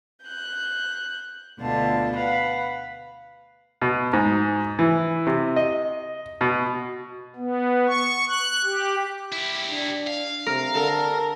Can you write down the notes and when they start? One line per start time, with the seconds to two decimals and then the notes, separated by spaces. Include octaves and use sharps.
0.24 F#6 G6
1.61 D2 B2 D3 F4 A5
2.15 B4 F5 F#5
3.82 B2
4.13 G#2
4.79 E3
5.27 C3
5.56 D#5
6.41 B2
7.36 B3
7.87 C#6
8.28 F#6
8.64 G4
9.32 E4 G4
9.70 D4
10.07 F5
10.46 C3 A#4
10.75 D3 A4 A#4